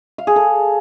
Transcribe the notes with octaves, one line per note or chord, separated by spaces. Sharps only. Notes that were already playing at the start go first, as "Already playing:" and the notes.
F5
G#4
A4